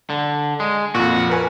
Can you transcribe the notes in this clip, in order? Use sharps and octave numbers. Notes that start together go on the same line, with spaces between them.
D3
G#3
F2 A#2 F#4
A#4 B4 G#5